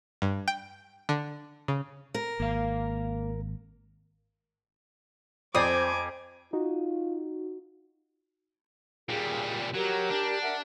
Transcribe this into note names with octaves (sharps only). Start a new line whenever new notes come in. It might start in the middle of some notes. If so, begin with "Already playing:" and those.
G2
G5
D3
C#3
A#4
G#1 A#3 F5
F2 C4 C5 D5 G#5 D6 D#6
D#4 F4 F#4
A#2 G3 G#4
F#3 G4 A#4
D4
A#4 E5 F#5